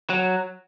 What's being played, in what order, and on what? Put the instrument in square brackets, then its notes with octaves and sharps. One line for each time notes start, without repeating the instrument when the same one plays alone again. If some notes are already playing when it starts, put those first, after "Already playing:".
[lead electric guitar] F#3